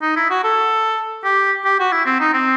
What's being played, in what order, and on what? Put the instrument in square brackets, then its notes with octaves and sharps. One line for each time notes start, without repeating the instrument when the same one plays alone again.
[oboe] D#4
E4
F#4
A4
G4
G4
F#4
E4
C4
D#4
C4